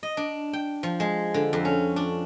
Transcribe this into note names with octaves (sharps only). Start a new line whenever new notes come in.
D#5
D4
G5
F3
G#3
D3
F2
C#4
D4